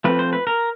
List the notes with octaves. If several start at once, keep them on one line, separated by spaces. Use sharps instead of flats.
F3 A3 C4 B4
C5
B4
A#4